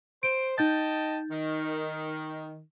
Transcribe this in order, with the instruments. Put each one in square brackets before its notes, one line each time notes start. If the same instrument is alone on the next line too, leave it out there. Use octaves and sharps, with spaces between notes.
[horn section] C5 [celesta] D7
[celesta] D#4 G6 A6 [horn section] D#5 G5 A5
[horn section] D#3